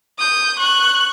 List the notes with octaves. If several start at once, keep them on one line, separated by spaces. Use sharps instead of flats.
D#6 G6
C#6 F#6